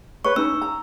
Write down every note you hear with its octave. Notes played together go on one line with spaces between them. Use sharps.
B4 C#5 C#6
C#4 D#4 E6
A#5